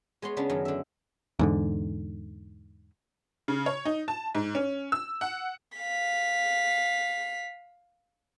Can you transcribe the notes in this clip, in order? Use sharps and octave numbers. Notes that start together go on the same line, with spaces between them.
G#3 B3 C#5 C6
C#3 B3 C#4 D4
F#2 D#3
D3 E5
E2 G#2 D3
C#3
C#5
D#4
A5
G#2
C#4
E6
F#5
F5 B6